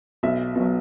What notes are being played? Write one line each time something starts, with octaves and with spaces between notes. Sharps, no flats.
B1 E5
B2 F#3